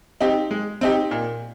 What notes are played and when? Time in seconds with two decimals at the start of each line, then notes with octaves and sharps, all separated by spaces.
0.21 C4 D#4 G4
0.51 G#3
0.81 C4 D#4 G4
1.11 A#2